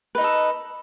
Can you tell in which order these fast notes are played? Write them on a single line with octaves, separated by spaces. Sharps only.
B4 D#4 D#5 A4